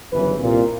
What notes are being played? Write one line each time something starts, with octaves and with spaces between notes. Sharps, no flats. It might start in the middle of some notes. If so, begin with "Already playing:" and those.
G1 F#2 C#3 E3 B4
C2 A#2